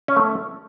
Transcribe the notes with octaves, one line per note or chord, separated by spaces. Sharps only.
C#4
A3